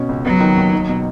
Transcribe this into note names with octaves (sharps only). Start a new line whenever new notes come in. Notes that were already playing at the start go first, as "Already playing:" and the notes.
Already playing: B2 C#4
C#2
F#3 B3
D#3
D#2
D#4
B2